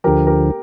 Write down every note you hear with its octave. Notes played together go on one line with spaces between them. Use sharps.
D2 D3 F3 G4 A#4
G4 A#4